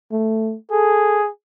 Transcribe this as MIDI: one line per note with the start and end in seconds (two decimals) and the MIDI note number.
0.12 0.55 57
0.71 1.29 68
0.71 1.20 69